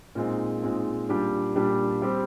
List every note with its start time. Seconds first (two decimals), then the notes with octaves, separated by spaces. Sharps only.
0.15 A#2 G#3 C4 D#4
0.62 A#2 G#3 C4 D#4
1.09 A#2 G3 D4 G4
1.56 A#2 G3 D4 G4
2.02 G3 C4 G4 C5